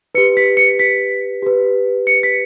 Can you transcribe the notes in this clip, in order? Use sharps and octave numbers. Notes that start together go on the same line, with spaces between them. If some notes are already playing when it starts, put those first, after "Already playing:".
G4 B4 C#7
B6
C#7
B6
G4 B4
C#7
B6